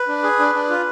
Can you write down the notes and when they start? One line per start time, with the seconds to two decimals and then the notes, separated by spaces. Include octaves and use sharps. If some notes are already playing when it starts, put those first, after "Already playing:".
Already playing: B4
0.08 D4
0.23 G#4
0.39 D4
0.55 D4
0.70 F4